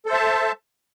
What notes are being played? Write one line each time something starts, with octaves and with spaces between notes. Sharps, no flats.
A4 C5 E5 A5